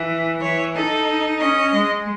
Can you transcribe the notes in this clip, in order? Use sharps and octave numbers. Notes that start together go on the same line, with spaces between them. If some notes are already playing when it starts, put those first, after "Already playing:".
Already playing: E3
E3 C#5
D#4 A4
C#4 D#5
G#3